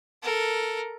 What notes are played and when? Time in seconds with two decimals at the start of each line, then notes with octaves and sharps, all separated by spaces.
0.23 A4 A#4